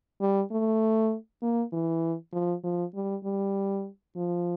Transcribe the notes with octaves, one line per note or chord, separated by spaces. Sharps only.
G3
A3
A#3
E3
F3
F3
G3
G3
F3